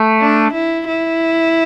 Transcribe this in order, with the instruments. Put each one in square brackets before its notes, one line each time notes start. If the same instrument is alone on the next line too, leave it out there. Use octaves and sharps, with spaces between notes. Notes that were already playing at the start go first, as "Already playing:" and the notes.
Already playing: [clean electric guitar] A3
[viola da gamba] D4
E4
E4